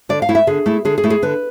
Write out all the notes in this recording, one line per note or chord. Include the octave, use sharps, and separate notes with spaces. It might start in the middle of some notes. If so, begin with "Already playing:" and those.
D3 D5
F5
A3 E4
E5
D3 G#4
A3 E4
D3 G#4
G#4
A3 E4
G#4
D3 B4